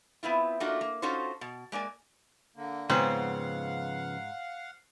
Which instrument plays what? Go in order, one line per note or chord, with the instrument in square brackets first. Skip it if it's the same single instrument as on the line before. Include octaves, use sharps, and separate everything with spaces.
[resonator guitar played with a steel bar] B3 C4 E4 F4
A3 A#3 D4 D#4 F4 F#4
A#3
C#4 D#4 F4 F#4 A4 C5
B2
G#3 A#3 D5 G#5
[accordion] D3 A#3
[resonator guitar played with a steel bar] G#2 [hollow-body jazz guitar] C#3 F3 B3 [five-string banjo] C4 [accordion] F5 F#5